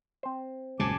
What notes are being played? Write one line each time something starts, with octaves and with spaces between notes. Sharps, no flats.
C4 C5
D#1 A#1 F#2 C#3 G#3 G#5 A5 D6